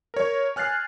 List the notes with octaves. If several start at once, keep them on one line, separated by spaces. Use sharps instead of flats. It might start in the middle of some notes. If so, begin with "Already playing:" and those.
A#4 C#5
G#5 F6 F#6 A6 C7